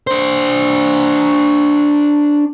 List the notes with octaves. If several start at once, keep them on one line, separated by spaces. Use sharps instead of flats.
D4 C5